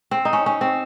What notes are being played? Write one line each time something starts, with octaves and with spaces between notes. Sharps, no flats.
C4
D#4
C#4
C#4
C4